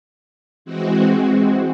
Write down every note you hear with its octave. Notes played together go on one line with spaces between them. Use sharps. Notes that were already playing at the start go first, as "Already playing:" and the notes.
E3 G#3 C4 F#4